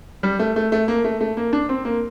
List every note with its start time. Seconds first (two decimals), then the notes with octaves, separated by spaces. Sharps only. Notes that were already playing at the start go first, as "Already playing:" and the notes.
0.23 G3
0.39 A3
0.56 A3
0.72 A3
0.88 A#3
1.05 A3
1.21 A3
1.37 A#3
1.53 D4
1.69 C4
1.85 A#3